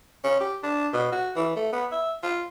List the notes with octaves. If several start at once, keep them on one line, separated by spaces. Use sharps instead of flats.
C#4
G4
D4
B2
F#4
E3
A3
B3
E5
F4